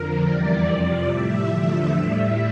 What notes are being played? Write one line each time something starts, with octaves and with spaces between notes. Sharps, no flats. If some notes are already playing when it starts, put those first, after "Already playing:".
Already playing: F2 D3 F3 A#4
E2 E3 G3 D5
F2 C3 F3
A2 G3 E5
E2 D3 F3 A3
A2 G3